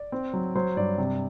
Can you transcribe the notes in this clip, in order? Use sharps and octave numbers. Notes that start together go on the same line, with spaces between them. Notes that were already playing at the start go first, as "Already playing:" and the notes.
Already playing: D5
C4
F#3
F#3 C5
G2 D5
C3